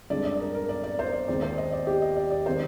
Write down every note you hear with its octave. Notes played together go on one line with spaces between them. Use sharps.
G2 D3 G#3 C4 D5
D5
A#4
A#4
D5
D5
C5
D5
D#2 D#3 G#3 C4 D5
C5
D#5
D5
G4
D#5
D5
D5
C3 D#3 G#3 C5